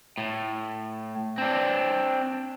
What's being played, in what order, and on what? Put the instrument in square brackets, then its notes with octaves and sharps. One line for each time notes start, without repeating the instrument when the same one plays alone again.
[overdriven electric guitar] A2
C4 D4